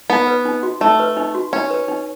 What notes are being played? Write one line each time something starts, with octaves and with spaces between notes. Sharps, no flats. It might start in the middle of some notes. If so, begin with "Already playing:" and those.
B3 D#4
B4
D#4
F#4
A3 D#4
B4
D#4
F#4
C#4 D#4
B4
D#4